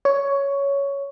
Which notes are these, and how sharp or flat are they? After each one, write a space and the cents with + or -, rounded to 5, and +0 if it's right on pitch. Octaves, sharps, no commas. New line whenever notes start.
C#5 +10